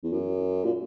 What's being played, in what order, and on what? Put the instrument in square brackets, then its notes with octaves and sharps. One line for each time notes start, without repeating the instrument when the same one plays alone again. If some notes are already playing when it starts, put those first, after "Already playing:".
[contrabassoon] E2
F#2
A#2